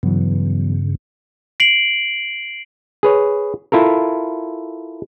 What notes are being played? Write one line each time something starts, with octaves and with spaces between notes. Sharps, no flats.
G2 C#3 E3 F#3 B3
C7 D7 F#7
G#4 B4 C#5
E4 F4 A4 A#4